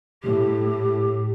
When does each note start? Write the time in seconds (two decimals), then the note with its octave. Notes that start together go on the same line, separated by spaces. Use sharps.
0.23 A2 G4